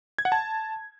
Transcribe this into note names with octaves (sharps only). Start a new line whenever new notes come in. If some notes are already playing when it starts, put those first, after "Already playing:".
G#6
F#5
A5